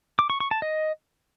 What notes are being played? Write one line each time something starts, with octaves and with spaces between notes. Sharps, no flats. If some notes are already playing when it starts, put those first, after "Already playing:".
D6
C#6
C#6
A5
D#5